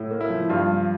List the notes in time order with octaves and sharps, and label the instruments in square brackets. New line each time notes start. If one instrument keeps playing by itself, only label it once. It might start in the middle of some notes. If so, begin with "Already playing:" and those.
Already playing: [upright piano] A2
A#3
[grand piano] E4
[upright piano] F3
[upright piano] G2 [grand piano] F4
[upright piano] F3